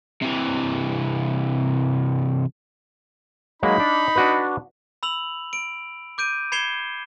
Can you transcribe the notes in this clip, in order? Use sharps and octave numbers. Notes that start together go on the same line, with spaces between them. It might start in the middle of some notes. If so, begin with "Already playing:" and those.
C3 E3
F#3 G#3 A#3 D#4 B5
D4
D4 F#4 B4
B5 E6 F7 F#7
D7
D6 G6 D7 D#7
B5 G#6 C7 C#7 E7 G7